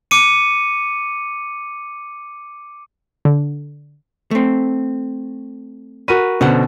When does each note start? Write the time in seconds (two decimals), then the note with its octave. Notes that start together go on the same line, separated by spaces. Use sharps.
0.11 D6 C#7 D#7
3.25 D3
4.31 A3 C4
6.08 F#4 A#4 B4 D#7
6.41 B2 D3 C#4 C5 F#5